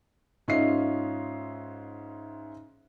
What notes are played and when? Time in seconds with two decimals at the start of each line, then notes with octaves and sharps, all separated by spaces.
0.48 G#2 C#4 F4 D#5 E5 C7